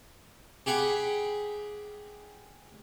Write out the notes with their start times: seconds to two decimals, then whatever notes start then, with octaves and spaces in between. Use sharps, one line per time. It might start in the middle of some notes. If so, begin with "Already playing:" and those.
0.66 G4 G#4 F#5 B5